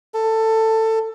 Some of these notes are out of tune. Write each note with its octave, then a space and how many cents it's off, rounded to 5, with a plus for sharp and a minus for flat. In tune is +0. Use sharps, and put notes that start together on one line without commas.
A4 +15